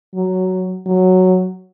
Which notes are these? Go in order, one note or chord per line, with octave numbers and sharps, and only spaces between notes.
F#3
F#3